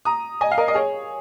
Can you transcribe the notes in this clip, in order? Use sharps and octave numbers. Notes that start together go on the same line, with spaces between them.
A#5 D#6
D#5 G#5
F5
A#4 D#5
D#5
G#4 C#5